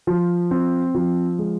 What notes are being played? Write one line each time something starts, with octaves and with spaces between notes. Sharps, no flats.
F3
C4
F3
G#3